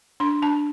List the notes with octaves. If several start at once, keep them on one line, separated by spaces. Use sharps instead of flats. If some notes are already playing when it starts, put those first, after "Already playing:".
D4 C6
D4 A5